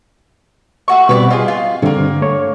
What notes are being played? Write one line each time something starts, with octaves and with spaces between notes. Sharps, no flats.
A3 F#4 C#6
B2 G3 C4 B4 C#5 D5
F4 G#4 D#5
F4
G2 D3 A#3 C4 C#4
A3 C#5